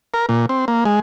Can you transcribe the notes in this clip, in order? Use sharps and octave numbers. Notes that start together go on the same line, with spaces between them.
A#4
A#2
C4
A#3
G#3